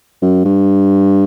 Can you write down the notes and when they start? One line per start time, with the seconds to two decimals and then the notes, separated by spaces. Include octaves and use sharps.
0.22 F#2
0.45 G2